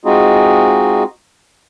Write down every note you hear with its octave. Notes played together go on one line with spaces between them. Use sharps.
G#3 C4 D#4 F4 F#4 G#4